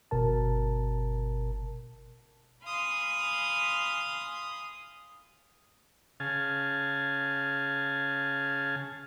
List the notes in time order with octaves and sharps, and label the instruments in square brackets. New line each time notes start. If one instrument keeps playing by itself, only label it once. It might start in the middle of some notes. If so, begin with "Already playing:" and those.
[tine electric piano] G1 B2 A#4 A5
[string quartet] F5 G#5 B5 C6 D#6
[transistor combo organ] C#3 G#4 F5 G#5 A5